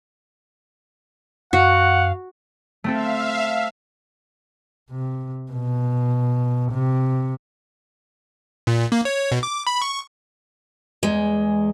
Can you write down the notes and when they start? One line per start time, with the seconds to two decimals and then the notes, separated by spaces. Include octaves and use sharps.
1.53 F#2 F#4 F5 F#5
2.84 A3 C4 A4 E5 F5
4.91 C3
5.52 B2
6.72 C3
8.67 A#2
8.92 A#3
9.05 C#5
9.32 B2
9.43 D6
9.67 B5
9.82 C#6
11.03 E2 G#3